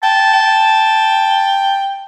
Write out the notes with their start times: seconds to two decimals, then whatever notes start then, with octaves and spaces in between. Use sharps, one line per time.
0.03 G5 A5
0.34 G5